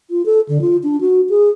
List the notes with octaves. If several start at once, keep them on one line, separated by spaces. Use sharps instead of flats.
F4
A4
D3
F4
D4
F#4
G#4